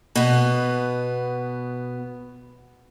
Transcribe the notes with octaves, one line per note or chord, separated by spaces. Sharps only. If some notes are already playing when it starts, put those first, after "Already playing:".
B2 B3